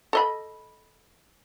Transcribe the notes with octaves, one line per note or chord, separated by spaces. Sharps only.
A4 D#5 B5